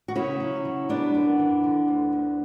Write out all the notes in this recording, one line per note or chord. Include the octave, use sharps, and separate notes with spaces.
F#4
C#3 C#4 E4
F#3
F#3
G3 B3 D4
F#2
E3
D3
D2
D2